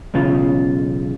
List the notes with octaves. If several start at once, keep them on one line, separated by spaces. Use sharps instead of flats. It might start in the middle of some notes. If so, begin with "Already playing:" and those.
B1 E2 C#3 F4